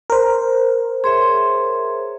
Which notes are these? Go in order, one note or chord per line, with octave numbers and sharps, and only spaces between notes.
A#4 C5
G#4 C#5 E5 C6